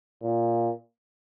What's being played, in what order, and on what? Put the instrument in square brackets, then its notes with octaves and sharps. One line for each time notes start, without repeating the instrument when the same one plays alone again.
[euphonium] A#2